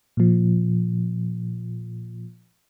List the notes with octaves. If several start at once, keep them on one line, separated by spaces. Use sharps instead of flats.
A#2 F3